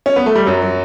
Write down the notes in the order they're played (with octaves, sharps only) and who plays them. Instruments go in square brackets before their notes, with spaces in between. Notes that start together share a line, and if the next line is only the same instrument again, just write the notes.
[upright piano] C#4
B3
A3
G3
F#2 F#3
F#3